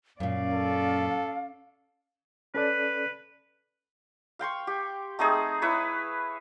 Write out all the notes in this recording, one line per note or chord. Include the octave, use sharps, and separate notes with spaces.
F#2 A#2 C#4 D5 F5
A4
C#4 A4 B4 D5
F5 G5 C6 C#6
G4
A3 C4 D#4 G#4
E4 B4 C#5